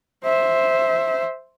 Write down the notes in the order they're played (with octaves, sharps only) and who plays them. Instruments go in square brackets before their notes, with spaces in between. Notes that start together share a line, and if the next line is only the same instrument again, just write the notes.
[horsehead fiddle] C5 E5